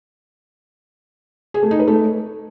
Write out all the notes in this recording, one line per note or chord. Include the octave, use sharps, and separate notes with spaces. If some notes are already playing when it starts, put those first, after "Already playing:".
G#4
A3
D#4
B4
A3